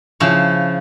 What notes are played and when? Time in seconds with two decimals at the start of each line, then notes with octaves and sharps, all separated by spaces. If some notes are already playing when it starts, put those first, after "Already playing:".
0.20 C#3 F3 E4 C#5